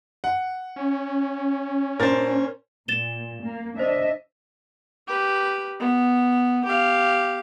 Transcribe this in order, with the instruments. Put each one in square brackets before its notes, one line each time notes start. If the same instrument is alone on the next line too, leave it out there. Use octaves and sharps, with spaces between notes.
[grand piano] F#5
[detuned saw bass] C#4
[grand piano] A#2 D4 A6 [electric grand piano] A#4 C5
[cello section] A#2 [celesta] A6 E7 G7
[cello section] A#3
[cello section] D4 D#5 E5 [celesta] C5
[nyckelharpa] G4 B4
B3
G4 F5